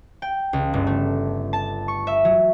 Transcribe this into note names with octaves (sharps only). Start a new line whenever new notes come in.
G5
C#2
G1
A3
A5
C#6
E5
F#3